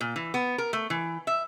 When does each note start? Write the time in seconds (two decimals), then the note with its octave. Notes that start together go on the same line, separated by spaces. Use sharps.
0.01 A#2
0.16 E3
0.34 B3
0.58 A#4
0.73 A3
0.90 E3
1.27 E5